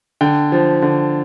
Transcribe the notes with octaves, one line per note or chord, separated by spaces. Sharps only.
D3 G5
F3
D3